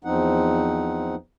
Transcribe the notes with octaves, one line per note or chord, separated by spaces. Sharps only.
E2 F3 C4 D#4 F#5